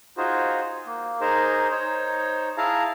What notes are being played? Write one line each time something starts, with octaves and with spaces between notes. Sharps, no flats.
D#4 F4 F#4 G#4 C5
A#3
D#4 G#4 A#4 C5
D#4 C5 C#5
E4 G#4 F5 A5 A#5